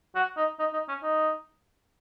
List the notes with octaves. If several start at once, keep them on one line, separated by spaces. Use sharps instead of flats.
F#4
D#4
D#4
D#4
C#4
D#4